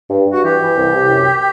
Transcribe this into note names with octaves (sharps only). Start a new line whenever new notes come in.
G2
G2
F#4
E3 G4
E3
C2
C3
F#2